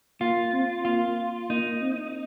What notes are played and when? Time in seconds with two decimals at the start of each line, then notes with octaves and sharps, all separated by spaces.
0.21 A#3 F4
0.53 C4
0.85 A#3 F4
1.50 A#3 D#4
1.81 C4